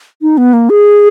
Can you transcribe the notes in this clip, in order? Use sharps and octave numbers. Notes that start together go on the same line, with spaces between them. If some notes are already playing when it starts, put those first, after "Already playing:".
D#4
B3
A#3
G#4